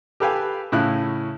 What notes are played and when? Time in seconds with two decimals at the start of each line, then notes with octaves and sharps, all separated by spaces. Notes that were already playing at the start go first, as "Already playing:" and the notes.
0.20 G4 A4 B4 F5 G5 G#5
0.72 A2 C#3 E4 F#6